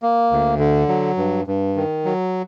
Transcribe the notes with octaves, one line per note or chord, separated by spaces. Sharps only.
A#3
D2
D3
F#3
G2
G2
D#3
F#3